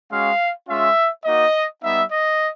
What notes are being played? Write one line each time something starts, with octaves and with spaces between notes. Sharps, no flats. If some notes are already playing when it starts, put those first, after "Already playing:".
G#3 C#4 F#4 F5
G#3 C#4 F4 E5
A#3 D#4 F#4 D#5
G3 B3 D#4 E5
D#5